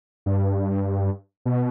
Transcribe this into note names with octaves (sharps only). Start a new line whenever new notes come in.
G2
B2